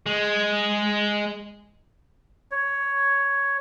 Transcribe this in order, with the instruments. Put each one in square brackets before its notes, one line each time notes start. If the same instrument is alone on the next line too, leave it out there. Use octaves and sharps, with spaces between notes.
[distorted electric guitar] G#3
[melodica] C#5